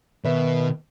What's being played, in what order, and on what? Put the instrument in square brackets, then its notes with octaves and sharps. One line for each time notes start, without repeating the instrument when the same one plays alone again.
[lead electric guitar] B2 [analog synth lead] D#3 [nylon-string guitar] B4 E5